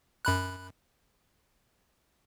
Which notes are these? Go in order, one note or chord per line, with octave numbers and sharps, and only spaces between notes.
F#2 B5 F#6